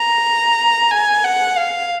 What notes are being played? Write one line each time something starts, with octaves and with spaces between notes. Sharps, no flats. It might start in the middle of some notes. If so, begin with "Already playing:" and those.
Already playing: A#5
G#5
F#5
F5